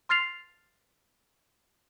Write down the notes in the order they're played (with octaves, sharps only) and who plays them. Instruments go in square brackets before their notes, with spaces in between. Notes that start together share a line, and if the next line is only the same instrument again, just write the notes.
[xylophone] C6 F6 A6 C7 F7